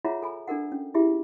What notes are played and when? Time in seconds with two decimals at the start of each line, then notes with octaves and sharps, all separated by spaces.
0.05 F4 G#4 C#5 E5 F#5 A#5
0.22 A4 G#5 B5
0.48 D4 A4 A#4 F#5
0.72 C#4
0.94 E4 F4 G4 G#4 E5